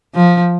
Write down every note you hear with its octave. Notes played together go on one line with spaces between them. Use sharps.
F3